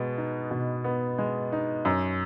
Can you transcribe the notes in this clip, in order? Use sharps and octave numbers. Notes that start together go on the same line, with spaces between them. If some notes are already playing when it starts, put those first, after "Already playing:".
Already playing: B2 G#3 B3
D#4
B2
B3
G#3
D#4
F#2